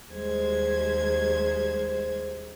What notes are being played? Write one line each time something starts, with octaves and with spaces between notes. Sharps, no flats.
D#2 G3 G#3 C5 G#6